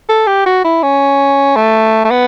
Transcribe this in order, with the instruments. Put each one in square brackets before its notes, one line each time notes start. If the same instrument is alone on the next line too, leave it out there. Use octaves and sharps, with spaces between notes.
[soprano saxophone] A4
G4
F#4
E4
C#4
A3
A3
B3